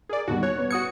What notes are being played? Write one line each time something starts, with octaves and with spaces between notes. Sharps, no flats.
G#4 A#4 D5
D#2 B2 G3 F#4
C#5 F#6
B3
F#4 D#6 G#6 C#7